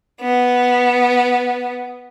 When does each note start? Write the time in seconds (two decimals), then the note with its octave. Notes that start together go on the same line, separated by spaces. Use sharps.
0.22 B3